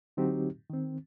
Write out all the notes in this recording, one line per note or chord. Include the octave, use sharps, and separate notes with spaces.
D3 F#3 C4 D#4 F#4 G4
D#3 C4